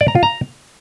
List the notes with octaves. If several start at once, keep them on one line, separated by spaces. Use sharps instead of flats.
D5
A#5
F4
A#5